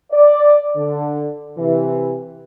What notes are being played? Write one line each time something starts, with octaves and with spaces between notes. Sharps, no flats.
D5
D3
C3 E3